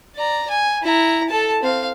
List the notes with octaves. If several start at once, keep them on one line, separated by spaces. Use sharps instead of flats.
D5 A#5
G#5
E4 A#5
A4 A5
C4 F5